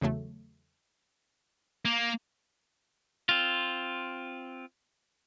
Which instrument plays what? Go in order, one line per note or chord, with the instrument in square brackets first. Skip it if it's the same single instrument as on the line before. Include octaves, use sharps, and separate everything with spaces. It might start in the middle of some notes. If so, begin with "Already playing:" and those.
[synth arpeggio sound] E2 C#3 F#3 A3
[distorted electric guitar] A#3
[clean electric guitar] C4 F4